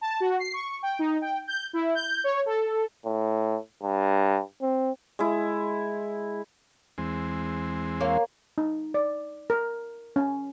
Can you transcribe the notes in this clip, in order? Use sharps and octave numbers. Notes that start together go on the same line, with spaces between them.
A5
F#4
C7
C#6
G5
D#4
G5
G6
E4
G6
C#5
A4
A2
G2
C4
G#3 E4
E2 G#3 C4
A#3 C#5 F5
D#4
D5
A#4
C#4